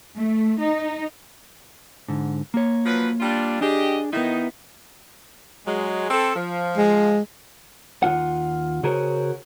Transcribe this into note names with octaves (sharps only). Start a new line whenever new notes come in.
A3
D#4
G#2 D3
A#3 C#5
F3 F#3 B4
G3 D4 F4
D4 G4 G#4 D#5
D#3 B3 D#4 E4
F#3 G#3
C4 A4
F3
G#3
D#2 C3 F4 F#5
C#3 F#4 G#4 A#4 C5 C#5